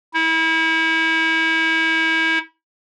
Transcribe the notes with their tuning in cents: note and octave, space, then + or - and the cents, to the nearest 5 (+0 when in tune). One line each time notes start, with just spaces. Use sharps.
E4 -30